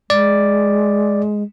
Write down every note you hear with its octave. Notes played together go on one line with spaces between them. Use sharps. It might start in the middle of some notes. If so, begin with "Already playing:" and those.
G#3 D5